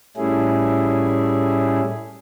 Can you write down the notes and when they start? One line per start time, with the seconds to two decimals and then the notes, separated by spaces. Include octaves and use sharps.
0.17 A2 G3 A3 C#4 E4 G#4